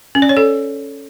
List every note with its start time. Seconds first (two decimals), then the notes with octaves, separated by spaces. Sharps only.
0.15 C#4
0.22 D5
0.29 C#5
0.37 A4